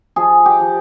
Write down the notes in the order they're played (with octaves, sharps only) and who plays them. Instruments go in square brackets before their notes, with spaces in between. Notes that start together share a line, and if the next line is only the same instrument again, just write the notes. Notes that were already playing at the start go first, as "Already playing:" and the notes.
[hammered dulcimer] F3 G#4
G4
F3